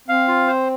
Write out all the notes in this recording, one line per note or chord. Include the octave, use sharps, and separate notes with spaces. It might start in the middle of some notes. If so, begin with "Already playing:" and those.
C4 F5
F4
C5